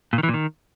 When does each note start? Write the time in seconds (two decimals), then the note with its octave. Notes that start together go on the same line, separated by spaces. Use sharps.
0.13 A#2
0.18 D#3
0.23 E3
0.29 A#2
0.34 D#3